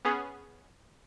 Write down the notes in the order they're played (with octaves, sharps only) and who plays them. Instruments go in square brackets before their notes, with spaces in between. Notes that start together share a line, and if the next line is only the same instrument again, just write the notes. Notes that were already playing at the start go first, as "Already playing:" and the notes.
[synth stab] B3 C#4 G#4